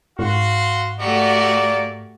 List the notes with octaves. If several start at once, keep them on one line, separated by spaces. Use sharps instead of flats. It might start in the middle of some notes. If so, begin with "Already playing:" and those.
G#2 F#4 F5 C6
A3 A#3 F#4 G4 D5